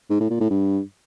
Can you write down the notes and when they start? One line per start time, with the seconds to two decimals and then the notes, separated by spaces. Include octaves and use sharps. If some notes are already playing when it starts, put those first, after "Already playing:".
0.10 G#2
0.20 A2
0.30 A#2
0.40 A2
0.50 G2